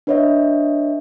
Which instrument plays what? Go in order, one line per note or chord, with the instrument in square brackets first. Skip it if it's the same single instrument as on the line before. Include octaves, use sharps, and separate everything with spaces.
[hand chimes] D4 B4 C#5 D#5 E5